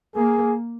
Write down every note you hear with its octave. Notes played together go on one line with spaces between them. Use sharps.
A#3 G#4